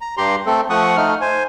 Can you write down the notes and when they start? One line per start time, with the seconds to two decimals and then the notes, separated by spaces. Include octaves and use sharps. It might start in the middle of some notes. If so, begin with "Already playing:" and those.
0.01 A#5
0.17 G2 G4 A#5 C6
0.46 A3 C4 A4
0.70 F3 A3 F#5 C#6 D#6
0.97 A3 D#4 F6
1.21 C5 G#5